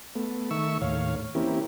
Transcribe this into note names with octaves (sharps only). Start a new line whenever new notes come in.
A3 B3
D#3 A3 E5 C#6 E6
D#2 A2 C#5 F5
E3 A#3 C4 C#4 E4 G4